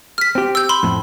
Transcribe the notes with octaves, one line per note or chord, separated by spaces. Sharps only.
F6 B6
C4 G4
E6 G6
B5 C6
F2 A2